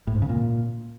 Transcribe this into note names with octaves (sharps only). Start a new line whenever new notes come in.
A2
G#2
C#3
A#2